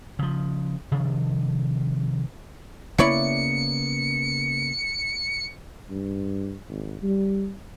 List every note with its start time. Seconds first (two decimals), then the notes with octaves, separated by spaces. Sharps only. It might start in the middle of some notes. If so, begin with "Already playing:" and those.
0.19 C#3 F3
0.92 C3 D#3 F3 D4
2.98 C#3 A#3 B3 E4 C#5 D5 C#7
5.90 G2
6.69 G#1
7.03 G3